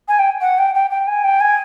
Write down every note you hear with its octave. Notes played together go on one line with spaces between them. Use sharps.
G#5
G5
F#5
G5
G5
G5
G#5
G5
G#5